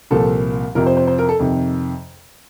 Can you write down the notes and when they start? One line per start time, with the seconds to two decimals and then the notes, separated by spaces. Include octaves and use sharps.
0.11 C2 A#2 F3 A4
0.75 F2 C3 F3 A#4
0.86 C5
0.97 C5
1.07 C5
1.18 A#4
1.29 A4
1.39 F2 C3 D#3